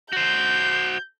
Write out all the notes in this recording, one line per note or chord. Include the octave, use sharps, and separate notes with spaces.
F#4 C5 G6